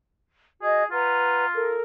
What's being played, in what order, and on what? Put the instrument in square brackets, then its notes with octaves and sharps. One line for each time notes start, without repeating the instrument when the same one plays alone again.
[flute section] F#4 D#5 [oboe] G#4
[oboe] F4 [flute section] B4 F#5 A#5
[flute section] A4 A#4